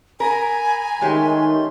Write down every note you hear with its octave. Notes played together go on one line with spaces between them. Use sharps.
A#4 G#5 A#5 B5
D#3 G#3 A3 C#4 G4 C6